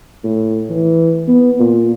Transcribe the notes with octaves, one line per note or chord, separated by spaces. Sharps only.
A2
E3
B3
A#2